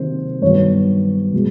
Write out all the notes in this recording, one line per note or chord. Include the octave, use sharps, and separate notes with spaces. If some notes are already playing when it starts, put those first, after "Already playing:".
Already playing: C3 D#3 F#3 A#3 C5
G2 D#3 F#3 B3 C#5
B2 G#3